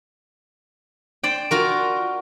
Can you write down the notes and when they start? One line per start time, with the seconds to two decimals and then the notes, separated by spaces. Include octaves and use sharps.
1.23 C5 D5 G5
1.51 F4 F#4 A#4